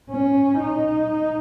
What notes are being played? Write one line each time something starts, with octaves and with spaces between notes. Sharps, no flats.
C#4
D#4